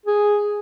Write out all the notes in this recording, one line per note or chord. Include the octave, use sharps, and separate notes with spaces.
G#4